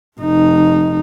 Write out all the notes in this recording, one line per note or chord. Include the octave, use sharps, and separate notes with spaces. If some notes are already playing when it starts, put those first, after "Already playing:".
F1 D#4